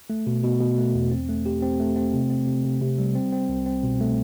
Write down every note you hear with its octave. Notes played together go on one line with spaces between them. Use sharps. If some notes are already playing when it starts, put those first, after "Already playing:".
A3
B2
B2
B2
A3
E2
C4
A3
G4
C4
A3
C4
C3
C4
C3
C3
C3
G3
C4
C4
C2
C4
B2
A3